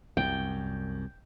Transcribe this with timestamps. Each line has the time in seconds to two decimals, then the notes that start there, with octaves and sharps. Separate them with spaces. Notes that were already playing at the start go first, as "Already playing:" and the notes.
0.17 C2 F#2 G5